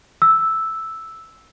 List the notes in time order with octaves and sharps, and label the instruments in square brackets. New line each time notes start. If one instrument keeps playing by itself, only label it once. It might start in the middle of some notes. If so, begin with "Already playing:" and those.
[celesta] E6